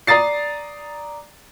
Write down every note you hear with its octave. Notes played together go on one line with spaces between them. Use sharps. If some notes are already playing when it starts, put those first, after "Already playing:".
D5 A#5 D#6 A6 C7